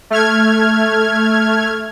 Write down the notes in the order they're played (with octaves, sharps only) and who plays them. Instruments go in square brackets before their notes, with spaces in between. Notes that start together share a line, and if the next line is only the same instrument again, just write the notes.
[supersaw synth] A3 F6 G#6